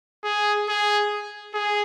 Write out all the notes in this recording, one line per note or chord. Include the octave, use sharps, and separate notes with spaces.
G#4
G#4
G#4